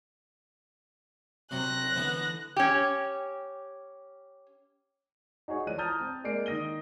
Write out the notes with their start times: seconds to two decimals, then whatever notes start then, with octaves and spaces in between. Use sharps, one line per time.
1.51 C3 F#3 F#6 A#6
1.94 D3 E3 B3
2.56 C#4 G4
5.48 D#4 F#4 G#4 C#5
5.66 E3 F3 D5 F#6 D#7
5.78 A5 A#5 D#6 F6 G6 A6
6.00 C4
6.24 G#3 A#3 D5 C7 D7
6.46 D#3 D#6 A#6 D#7 G7